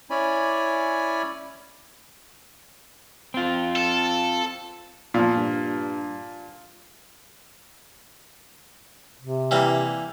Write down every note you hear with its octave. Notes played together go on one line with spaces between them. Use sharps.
C#4 E4 C#5 D5 G#5 B5
C4 F4
A4
A#2 F3
G2
C3
E3 G3 A#3